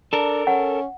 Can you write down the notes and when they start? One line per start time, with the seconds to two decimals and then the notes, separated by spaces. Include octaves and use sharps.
0.13 D4 A4 A#4
0.47 C#4 F#5